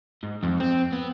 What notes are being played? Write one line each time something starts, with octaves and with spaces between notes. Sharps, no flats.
G#2
F2
C4
B3